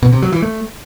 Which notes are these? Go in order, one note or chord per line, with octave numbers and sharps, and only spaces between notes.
B2
C3
F#3
E3
A3